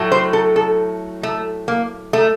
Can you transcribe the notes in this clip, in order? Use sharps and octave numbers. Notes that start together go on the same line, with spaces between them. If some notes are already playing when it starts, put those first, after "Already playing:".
Already playing: A2 F#3 A3
C5
A4
A4
A3
A#3
A3